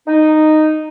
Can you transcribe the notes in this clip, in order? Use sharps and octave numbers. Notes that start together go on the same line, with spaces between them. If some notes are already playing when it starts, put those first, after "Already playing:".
D#4